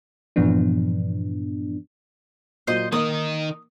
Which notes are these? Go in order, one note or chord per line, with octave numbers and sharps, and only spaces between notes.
G2 A#2 E3 F3 B3 D4
A#2 F#3 C5 D#5
D#3 A#3 D#4 D#6